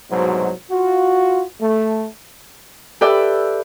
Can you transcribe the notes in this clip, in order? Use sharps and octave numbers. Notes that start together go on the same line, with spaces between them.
C2 G#2 B2 F#3 C5
F4 F#4
A3
G4 A4 B4 D5 E5 G5